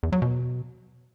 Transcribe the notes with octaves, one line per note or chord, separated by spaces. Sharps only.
E2
F#3
B2